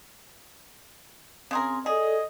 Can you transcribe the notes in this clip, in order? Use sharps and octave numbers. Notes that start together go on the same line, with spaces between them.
C#3 C4 G#4 A#4 C6
G#4 A4 D5 D#5